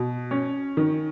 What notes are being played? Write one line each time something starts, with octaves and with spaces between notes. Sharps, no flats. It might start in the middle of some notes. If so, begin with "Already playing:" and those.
Already playing: B2
C#4
D#3